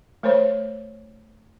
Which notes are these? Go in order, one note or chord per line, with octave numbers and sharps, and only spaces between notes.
A3 A#4 C5 C#5